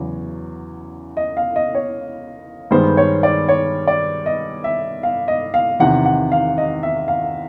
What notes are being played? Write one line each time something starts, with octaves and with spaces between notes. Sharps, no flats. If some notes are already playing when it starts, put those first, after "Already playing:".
Already playing: E2 C#3 F#3
D#5
F5
D#5
C#5
G2 D#3 G#3 B3 C5
C#5
D5
C#5
D5
D#5
E5
F5
D#5
F5
E2 C3 D#3 F#5
F#5
F5
D#5
E5
F5